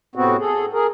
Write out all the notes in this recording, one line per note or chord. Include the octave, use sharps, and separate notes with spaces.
A2 C3 B3 C4 F#4
G#4 A4
G#4 A#4